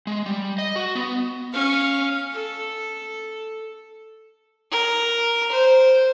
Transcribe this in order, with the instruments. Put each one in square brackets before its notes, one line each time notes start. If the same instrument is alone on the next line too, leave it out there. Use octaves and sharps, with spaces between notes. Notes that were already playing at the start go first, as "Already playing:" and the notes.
[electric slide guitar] G#3
G3
D#5
F#4
B3
[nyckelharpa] C#4 F5
A4
[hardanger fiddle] A#4
C5